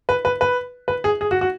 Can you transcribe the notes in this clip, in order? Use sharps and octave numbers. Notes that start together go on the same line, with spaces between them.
B4
B4
B4
B4
G#4
G#4
F#4
F#4